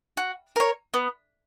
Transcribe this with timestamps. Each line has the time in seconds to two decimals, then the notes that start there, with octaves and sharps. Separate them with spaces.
0.17 F#4
0.56 A#4 C#5
0.94 B3